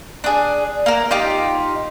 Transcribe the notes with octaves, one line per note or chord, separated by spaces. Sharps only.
D4 G#4
A#3 A#4
D#4 F4 G4